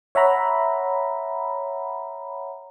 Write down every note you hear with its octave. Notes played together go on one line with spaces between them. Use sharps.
C#5 E5 F#5 A#5 B5